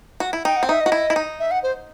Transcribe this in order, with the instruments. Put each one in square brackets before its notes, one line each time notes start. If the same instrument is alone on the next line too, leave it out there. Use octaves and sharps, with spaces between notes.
[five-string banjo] F#4
E4
[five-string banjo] D#4 [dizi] G5
[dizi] F#5
[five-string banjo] C4
[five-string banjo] D#4 [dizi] E5
[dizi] D#5
[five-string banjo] F#4
E4
E4
D#4
[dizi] E5
F#5
C5